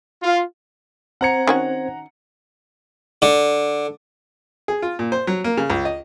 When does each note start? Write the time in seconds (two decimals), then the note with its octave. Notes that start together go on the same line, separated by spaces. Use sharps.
0.23 F4
1.21 C4 C5 F#5 A#5 G#6 C#7
1.47 D#3 C#4 F#4
3.22 D3
4.68 G#4
4.82 F4
4.99 A#2
5.12 C5
5.27 F#3
5.44 A#3
5.57 C#3
5.70 C#2
5.85 D#5